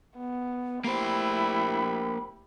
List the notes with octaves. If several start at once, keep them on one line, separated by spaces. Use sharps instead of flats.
B3
A3 A#3 E4 G4 C5 B5